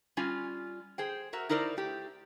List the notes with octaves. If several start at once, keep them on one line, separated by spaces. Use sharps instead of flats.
G3 C#4 F4 G#5
G#4 C5 G5
F#4 A#4 E5
D#4 E4 A#4 C5 D5
A3 G4